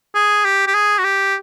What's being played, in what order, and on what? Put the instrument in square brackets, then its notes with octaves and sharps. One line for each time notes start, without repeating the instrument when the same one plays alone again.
[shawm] G#4
G4
G4
G#4
F#4
G4